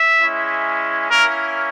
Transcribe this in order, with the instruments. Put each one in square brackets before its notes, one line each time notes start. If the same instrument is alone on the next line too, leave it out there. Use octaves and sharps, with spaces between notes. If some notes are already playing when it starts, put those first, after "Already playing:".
Already playing: [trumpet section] E5
G#3 C#4 E4
A#3 C#4 E4 A#4